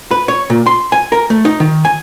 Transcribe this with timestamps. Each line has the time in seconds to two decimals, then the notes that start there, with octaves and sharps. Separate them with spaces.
0.11 B4
0.28 C#5
0.50 A#2
0.66 C6
0.92 G#5
1.12 A#4
1.30 A3
1.45 D#4
1.60 D#3
1.85 G#5